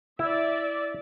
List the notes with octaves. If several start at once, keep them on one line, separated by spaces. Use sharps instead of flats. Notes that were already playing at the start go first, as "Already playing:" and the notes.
E4 D5 E5